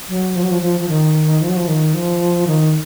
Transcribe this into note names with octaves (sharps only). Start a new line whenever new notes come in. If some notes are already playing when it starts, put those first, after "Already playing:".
F#3
F3
F#3
F3
F3
F3
D#3
F3
F#3
F3
D#3
F3
D#3